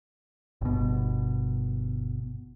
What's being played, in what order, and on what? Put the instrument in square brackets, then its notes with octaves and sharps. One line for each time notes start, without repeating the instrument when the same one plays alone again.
[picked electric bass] G1 B2